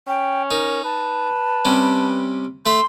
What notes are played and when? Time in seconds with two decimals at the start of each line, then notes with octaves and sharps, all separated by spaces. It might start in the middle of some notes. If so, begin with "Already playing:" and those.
0.07 C#4 G5
0.51 D#4 A#4
0.84 B4 A5
1.65 C3 G3 C#4
2.66 A3 E5 C6